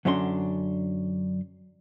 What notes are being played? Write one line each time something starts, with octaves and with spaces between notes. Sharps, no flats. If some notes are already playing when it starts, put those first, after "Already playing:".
F#2 D3 F#3 C#4 D4 C6